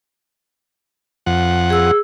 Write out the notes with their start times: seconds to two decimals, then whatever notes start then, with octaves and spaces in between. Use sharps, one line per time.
1.26 F2 F#5
1.70 G#4 E6